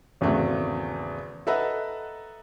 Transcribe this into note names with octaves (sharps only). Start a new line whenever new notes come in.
G#1 E2 C#3 A3 F#4
A4 B4 D#5 E5 F#5 A#5